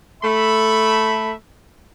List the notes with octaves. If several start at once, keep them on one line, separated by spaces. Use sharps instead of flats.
A3 E5 B5